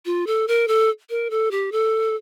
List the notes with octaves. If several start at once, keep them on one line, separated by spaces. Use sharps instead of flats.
F4
A4
A#4
A4
A#4
A4
G4
A4